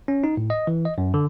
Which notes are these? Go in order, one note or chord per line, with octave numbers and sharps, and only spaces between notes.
C#4
D#4
A2
D#5
E3
D#5
F#2
D3